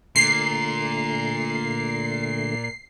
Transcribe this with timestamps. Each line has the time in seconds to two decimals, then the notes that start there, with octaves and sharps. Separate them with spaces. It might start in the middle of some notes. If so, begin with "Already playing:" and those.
0.16 A#2 D3 A3 C7